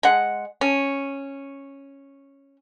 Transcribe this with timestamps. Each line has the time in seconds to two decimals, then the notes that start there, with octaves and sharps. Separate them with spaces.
0.03 G#3 F#5
0.61 C#4